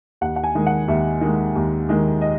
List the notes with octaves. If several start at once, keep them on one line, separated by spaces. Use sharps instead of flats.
D#2 F#5
F#5
G#5
D#3 G#3
F#5
D#2 E5
D#3 G#3
D#2
D#3 G#3
D#5